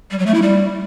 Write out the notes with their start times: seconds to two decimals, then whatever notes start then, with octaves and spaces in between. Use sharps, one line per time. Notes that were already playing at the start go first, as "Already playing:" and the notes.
0.11 G3
0.19 F#3
0.26 A3
0.34 E4
0.42 G3